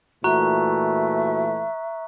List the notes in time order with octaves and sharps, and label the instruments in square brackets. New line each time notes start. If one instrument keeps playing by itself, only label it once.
[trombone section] A#2 E3 A3 [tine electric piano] F#4 [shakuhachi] E5 [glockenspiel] A#5 C#6 F#6